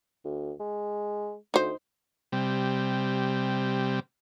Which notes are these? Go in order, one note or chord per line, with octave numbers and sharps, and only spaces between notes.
D2
G#3
D2 D#4 C5
C3 G3